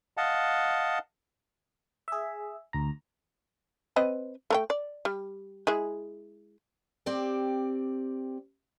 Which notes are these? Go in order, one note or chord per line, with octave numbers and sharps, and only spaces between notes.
D#5 F5 F#5 A5
G#4 E5
D2 A#5
C4 B4 D#5
A3 A#4 G5
D5
G3
G#3 E4 G#4
C4 G4 D5 G5